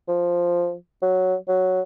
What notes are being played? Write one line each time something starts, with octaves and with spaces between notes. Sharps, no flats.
F3
F#3
F#3